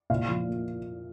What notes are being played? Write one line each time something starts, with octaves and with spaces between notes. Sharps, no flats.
A#2 F5
F3
A#3